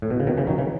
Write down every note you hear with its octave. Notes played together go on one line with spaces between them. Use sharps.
A2
B2
C#3
B2 D#3
C#3 E3
D#3 F#3
C#3 E3